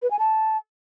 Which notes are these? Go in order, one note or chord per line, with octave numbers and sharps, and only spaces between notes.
B4
G#5
A5